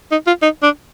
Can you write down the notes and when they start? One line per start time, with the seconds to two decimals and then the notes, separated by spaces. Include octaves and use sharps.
0.12 D#4
0.27 F4
0.42 D#4
0.63 D4